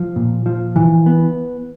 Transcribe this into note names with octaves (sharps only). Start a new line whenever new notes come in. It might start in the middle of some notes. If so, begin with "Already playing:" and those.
Already playing: F3
A#2
F3
E3
B3